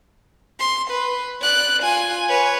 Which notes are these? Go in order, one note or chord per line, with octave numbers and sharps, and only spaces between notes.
C6
B4
D5 F#6
F4 G#5
B4 C#5